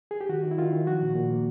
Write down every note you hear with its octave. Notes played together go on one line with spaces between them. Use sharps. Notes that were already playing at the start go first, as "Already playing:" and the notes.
G#4
G4
D#3 F#4
D#3
E4
D#3 F4
D#3
F3 F#4
A#2
A#2
A#3